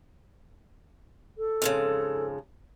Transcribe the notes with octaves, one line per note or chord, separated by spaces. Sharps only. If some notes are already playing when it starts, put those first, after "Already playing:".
A4
F2 G#2 C#3